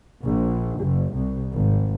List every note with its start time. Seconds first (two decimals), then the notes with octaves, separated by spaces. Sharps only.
0.24 A#1
0.81 F#1
1.14 C2
1.53 G#1